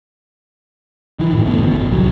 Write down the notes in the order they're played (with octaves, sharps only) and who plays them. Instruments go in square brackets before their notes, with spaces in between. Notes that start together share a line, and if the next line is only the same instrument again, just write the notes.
[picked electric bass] D#3 E3
F#2 A2
A1 D2 A3 B3
G1 D2 B2
F#1
D1 C2 F#3